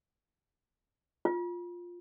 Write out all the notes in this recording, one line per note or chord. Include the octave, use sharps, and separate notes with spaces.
F4